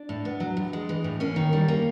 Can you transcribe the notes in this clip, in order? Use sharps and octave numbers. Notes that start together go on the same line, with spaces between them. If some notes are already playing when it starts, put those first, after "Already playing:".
Already playing: D4
A2
B3
F#3
A2
G#3
E3
A2
A#3 C#4
D#3
G3
A#3